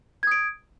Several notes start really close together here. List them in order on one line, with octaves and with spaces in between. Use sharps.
G#6 D#6 D7